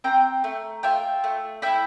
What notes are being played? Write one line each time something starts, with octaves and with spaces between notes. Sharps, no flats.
C4 G5 A#5
A3
F4 E5 G5
A3
E4 E5 G5